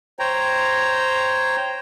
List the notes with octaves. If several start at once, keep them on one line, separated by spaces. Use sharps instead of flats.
C5 C#5 G5 A#5